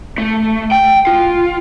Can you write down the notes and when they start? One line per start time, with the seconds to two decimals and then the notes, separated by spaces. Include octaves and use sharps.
0.18 A3
0.71 G5
1.07 F4